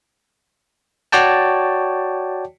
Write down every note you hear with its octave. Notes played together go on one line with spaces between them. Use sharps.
F#4 C#5 D5 G5 A5